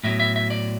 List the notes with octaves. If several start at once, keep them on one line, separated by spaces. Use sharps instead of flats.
A2 F#3 B3 E5
E5
E5
D5